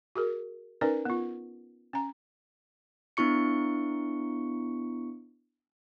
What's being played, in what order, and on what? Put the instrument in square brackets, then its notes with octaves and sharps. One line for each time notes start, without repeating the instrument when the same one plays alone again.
[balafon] F#4 G#4 A#4
C#4 D#4 A#4 B4 D5
B3 F4
C#4 A#5
[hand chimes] B3 D4 E4 C#6 C#7